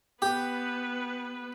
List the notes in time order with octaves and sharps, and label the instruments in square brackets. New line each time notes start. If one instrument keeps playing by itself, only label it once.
[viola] B3 B4 [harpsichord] G4